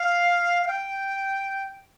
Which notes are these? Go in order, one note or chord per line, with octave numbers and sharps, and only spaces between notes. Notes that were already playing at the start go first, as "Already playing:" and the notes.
Already playing: F5
F5
G5